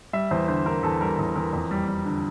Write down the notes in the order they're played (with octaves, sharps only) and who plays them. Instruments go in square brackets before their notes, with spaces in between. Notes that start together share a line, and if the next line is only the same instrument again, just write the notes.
[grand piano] G3 E5
E2 C5
D3 C5
D3 A#4
E2 A4
G3 A#4
E2
E2 A#4
F2
G3
G3
D3